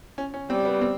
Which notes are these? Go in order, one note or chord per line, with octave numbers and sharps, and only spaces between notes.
C#4
C#4
G3 C4
B3
C4